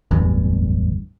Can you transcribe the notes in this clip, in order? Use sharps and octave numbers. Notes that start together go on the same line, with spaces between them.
D1 G1 E2 G2